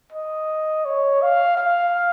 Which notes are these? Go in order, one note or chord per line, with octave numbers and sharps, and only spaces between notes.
D#5
C#5
F5
F5